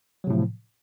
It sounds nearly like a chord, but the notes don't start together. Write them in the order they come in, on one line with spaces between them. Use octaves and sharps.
F#3 C3 A2 F3